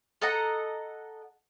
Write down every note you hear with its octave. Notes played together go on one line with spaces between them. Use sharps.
A4 D#5 F#5 A#5